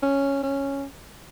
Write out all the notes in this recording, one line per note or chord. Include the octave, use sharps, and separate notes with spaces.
C#4
C#4